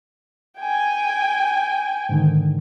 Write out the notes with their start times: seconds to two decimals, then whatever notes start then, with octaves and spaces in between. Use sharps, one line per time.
0.59 G5 G#5
2.09 G#2 D3 D#3